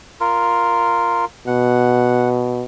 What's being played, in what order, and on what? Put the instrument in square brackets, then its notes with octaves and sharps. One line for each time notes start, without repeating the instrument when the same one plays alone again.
[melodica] F4 A#4
[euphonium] B2 [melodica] F#5